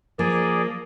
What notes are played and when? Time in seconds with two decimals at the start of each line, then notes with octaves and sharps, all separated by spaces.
0.19 F3 A#3 G#4 A#4 D5